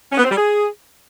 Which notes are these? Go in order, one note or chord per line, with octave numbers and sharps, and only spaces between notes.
C#4
B3
C4
G3
G#4